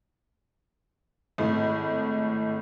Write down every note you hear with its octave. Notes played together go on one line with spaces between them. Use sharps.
G#1 A2